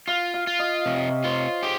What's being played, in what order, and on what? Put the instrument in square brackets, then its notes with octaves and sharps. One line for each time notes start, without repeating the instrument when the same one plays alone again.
[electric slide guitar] F4 [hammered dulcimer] F5
[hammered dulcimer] F5
[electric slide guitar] F4
[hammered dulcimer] D#5
[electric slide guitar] C3 [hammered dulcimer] C#5
[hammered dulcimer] D#5
C#5
[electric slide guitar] F4 [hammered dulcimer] C5
[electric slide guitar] G4 [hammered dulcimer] G#4